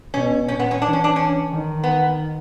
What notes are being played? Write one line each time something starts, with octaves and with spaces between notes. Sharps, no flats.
B2 C#4
A#2 C#4
B3
C#4
E3 D4
C#4
D4
C#4
D#3
B3